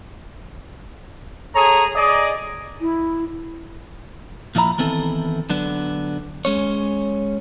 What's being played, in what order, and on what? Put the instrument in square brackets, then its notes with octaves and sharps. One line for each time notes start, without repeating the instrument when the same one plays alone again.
[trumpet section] G#4 A4 C#5 A#5
G#4 D5 D#5
[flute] E4
[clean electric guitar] A#2 F3 E4 D5 A#5 B5
D#3 E3 B3 C4 E4 A4
D3 F#3 B3 D4
G#3 C#4 C#5